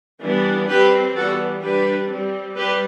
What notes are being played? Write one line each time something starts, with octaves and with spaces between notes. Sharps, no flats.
E3 G3 B3 D4
G3 C4 G4 B4
E3 G3 B3 F#4 A4
G3 D4 G4 B4
G3 C4
G3 G4 B4